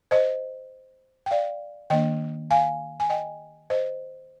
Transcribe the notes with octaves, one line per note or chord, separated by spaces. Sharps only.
C5 D#5
G5
D5 F5
D#3 A#3 D4 D#5 G5
F5 G#5
G#5
D#5 G5
C5 D#5